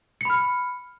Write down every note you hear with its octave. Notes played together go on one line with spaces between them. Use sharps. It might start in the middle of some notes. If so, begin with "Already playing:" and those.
B5 F6 C#7